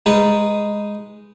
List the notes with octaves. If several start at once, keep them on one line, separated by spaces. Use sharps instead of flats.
G#3 D#4 B4